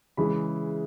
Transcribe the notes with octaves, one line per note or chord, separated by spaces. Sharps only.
C#3 E3 G#3 B5